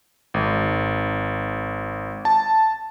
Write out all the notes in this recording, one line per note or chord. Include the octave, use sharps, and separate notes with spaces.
G#1
A5